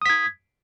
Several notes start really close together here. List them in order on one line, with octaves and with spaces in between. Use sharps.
D#6 B6 G#6